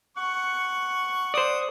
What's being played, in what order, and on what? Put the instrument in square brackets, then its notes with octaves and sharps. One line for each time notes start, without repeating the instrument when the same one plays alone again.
[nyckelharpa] F#5 [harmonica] C#6
[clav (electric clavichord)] C5 D5 [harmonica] D#6